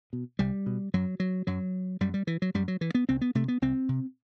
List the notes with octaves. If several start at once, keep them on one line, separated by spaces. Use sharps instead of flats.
B2
C2 G3
B2
F#2 F#3
F#3
F#2 F#3
F#2 G3
G3
E3
F#3
F#2 G3
F#3
E3
B3
C2 C4
B3
C3 A3
B3
C2 C4
C3